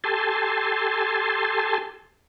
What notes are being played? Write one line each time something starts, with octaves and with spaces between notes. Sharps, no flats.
G4 A4 G#5 A5 C6